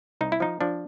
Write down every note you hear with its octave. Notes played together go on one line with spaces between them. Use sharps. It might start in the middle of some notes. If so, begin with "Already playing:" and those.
C2 D#4
E4
F3 D#4
F3 D4